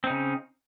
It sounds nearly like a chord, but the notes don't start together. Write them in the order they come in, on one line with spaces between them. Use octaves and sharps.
C4 D#4 C#3